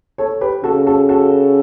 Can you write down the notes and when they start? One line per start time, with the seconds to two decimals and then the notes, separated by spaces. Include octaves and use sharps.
0.18 A4 C#5
0.41 G4 B4
0.64 C#3 F#4 A4
0.87 F#4 A4
1.09 F#4 A4